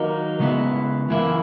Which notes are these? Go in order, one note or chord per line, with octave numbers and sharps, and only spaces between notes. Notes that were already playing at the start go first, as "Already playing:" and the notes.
Already playing: D#3 F#3 A#3 D#4 F#4
C#3 G#3 B3 E4
F#2 E3 A#3 E4